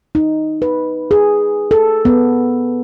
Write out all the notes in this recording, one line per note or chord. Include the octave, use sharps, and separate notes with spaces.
D#4
B4
G#4
A4
B3